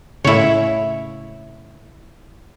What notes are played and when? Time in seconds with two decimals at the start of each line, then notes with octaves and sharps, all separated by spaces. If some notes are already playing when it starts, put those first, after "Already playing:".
0.24 A2 C#3 E4 C#5